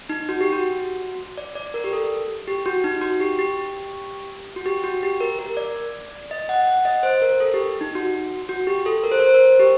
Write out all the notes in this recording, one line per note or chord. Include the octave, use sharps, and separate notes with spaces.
D#4
F#4
G4
F#4
D5
D5
A#4
G4
A4
G4
F#4
D#4
F#4
G4
G4
F#4
G4
F#4
G4
A#4
A#4
D5
D#5
F#5
F#5
D#5
C5
A#4
A4
G4
D#4
F#4
F#4
G4
A4
A#4
C5
A#4
C5
A#4
G4